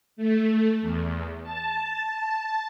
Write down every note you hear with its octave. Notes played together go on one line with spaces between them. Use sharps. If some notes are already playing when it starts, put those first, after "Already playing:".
A3
E2
A5